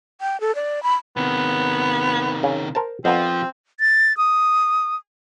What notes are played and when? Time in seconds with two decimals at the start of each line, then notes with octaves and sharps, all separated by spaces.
0.21 G5
0.41 A4
0.55 D5
0.83 B5
1.17 C3 D#3 B3
2.43 C#3
2.75 A#4 C5 A5
3.05 F2 F3 B3 C4
3.80 A6
4.17 D#6